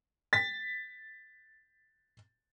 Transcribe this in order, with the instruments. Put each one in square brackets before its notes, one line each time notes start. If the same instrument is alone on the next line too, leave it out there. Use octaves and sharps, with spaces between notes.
[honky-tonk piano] A6 B6